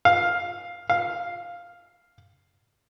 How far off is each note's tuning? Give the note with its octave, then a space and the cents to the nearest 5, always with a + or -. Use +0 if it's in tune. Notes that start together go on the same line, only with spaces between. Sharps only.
F5 +5
F5 +0